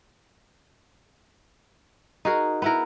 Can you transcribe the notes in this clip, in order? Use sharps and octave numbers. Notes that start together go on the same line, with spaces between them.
D#4 F#4 G#4 A#4
B3 E4 A#4